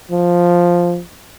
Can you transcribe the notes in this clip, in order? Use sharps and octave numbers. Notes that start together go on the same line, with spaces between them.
F3